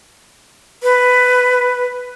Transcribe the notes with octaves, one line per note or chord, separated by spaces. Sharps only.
B4